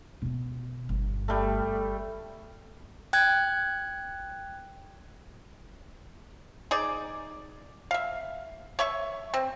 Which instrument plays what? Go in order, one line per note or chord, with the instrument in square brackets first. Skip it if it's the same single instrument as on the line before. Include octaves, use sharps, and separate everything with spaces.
[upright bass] B2 B3
G1
[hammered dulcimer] G3 A3
[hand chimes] G5 F#6 G#6
[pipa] D#4 G#4 D5
E5 F5
C#5 E5 C#6
C4